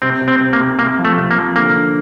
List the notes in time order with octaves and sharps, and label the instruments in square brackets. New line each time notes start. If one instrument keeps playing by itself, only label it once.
[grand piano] C3 [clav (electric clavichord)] C4
[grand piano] C3
[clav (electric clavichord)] C4
[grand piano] C3
[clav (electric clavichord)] A#3
[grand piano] C3
[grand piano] C3 [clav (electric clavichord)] A#3
[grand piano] F3
[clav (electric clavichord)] A3
[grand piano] C3
[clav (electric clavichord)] A#3
[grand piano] F3
[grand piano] D3 [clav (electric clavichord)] A#3
[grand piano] D4